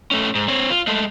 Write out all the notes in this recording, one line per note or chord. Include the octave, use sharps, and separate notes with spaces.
A3 C#4
G#2
C4 C#5
F4
G#3 A3